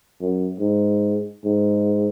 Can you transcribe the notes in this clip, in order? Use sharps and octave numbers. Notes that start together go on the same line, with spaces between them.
F#2
G#2
G#2